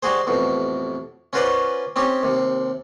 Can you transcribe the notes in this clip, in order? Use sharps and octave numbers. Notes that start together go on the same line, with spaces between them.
G3 D#4 F#4 G#4 C5
A1 F2 B2
C#4 F4 F#4 B4 C5 D5
C4 C#4 D#4 G4
D#2 C3